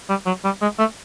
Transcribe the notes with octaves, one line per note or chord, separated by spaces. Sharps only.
G3
F#3
G3
G#3
A3